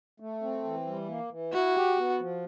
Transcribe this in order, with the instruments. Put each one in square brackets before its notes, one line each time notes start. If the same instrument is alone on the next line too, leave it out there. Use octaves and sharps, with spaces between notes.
[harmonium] A3
C4
E3
G3
A#3
E3
[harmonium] E4 [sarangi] F#4
[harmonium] G4
B3
F3